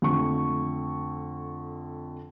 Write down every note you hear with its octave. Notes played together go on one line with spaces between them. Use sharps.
F2 D3 A3 C#6